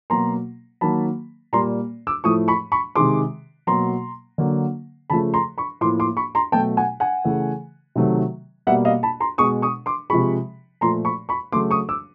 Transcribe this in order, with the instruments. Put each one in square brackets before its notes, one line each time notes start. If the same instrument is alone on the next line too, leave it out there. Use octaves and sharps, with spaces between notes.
[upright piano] B2 F#3 A#3 A#5 C6
D#3 F#3 A#3 A5 B5
A#2 G3 A#3 A#5 C6
D6 E6
A2 F3 A3 C#6 D#6
B5 C#6
B5 C#6
C3 D#3 G#3 C6 D6
B2 F#3 A#3 A#5 C6
D3 F#3 A#3
C#3 F3 A3 A5 B5
A#5 C6
B5 C#6
A2 F3 A#3 C6 D6
C6 D6
B5 C#6
A#5 C6
B2 F#3 A3 G5 A5
F#5 G#5
F#5 G#5
C#3 E3 A3
C3 D#3 F#3 A3
B2 G3 A#3 E5 F#5
D#5 F5
A5 B5
A#5 C6
B2 G#3 C#6 D#6
C#6 D#6
C6 D6
C3 F3 G#3 B5 C#6
A#2 F3 A3 A#5 C6
B5 C#6
B5 C#6
C#3 F#3 A3 C6 D6
C#6 D#6
D6 E6